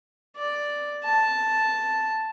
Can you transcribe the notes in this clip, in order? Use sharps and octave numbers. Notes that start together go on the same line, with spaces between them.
D5
A5